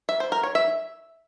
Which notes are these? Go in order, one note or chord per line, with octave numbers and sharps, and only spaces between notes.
E5
C5
A#4
C#5
E5